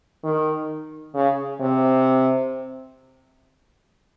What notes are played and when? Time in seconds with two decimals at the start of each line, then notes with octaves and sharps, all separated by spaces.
0.24 D#3
1.15 C#3
1.61 C3